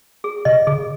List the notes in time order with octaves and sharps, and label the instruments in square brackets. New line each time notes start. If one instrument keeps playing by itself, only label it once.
[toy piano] G#4
[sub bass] C3 [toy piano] D#5
[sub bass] C#3 [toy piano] G#4